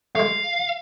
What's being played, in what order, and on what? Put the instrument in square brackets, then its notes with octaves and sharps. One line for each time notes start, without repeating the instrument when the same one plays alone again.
[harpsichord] G#3 A3 [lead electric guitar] F5